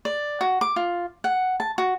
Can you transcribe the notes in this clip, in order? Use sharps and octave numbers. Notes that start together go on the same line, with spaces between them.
D5
F#4
D6
F4
F#5
A5
F#4